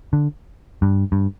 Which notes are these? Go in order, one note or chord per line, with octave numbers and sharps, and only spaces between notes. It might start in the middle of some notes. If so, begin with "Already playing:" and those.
D3
G2
G2